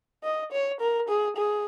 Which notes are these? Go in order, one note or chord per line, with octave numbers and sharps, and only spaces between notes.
D#5
C#5
A#4
G#4
G#4